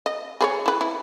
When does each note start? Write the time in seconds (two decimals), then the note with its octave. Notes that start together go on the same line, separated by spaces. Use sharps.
0.06 D#5
0.41 G#4 B4 C#5
0.66 E4 B4
0.81 E4